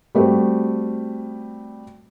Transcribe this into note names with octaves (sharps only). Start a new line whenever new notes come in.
G3 A3 C4 F#4